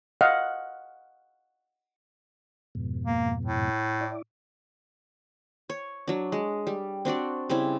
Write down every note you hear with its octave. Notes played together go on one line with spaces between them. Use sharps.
D#5 F5 F#5
F2 G#2 B2
A#3
A2
E4 D5
C#5
F#3 D4
G#3
G3
C4 D4 F#4 D5
C#3 G3 C4 E4